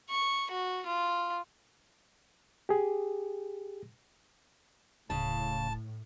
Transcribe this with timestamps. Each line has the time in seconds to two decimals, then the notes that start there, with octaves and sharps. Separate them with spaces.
0.10 C#6
0.51 F#4
0.87 F4
2.69 G4 G#4
5.10 D1 A2 C#3 A5